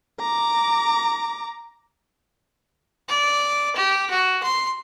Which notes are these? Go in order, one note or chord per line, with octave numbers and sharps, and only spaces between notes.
A#5 D6
D5
G4
F#4
C6